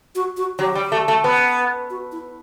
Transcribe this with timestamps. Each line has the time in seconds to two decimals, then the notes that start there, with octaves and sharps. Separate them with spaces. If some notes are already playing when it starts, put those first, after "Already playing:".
0.15 F#4
0.37 F#4
0.59 F#3 G4
0.75 G3
0.92 A3
1.08 A3
1.24 B3
1.90 F#4
2.12 E4